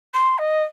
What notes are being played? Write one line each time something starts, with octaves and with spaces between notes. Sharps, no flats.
C6
D#5